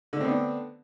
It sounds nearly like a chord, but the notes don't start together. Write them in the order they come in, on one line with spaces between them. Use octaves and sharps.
D3 A3 C4 B3 D4